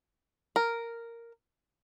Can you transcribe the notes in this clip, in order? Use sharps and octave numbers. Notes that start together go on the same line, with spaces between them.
A#4